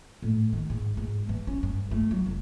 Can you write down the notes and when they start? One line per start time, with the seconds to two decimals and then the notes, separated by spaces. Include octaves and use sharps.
0.22 A2
0.53 D#3
0.70 G#2
0.97 G#2
1.29 E3
1.47 C#4
1.63 G2
1.91 A3
2.11 F#3
2.26 F1